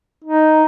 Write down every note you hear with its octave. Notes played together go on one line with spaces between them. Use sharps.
D#4